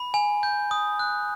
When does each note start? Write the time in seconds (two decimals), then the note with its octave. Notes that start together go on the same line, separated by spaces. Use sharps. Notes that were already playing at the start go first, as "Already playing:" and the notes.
Already playing: B5
0.14 G#5
0.43 G6
0.71 D#6
0.99 F#6